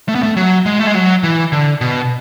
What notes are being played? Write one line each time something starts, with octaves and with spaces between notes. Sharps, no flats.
A3
B3
A3
F#3
G#3
A3
G#3
F#3
E3
D3
B2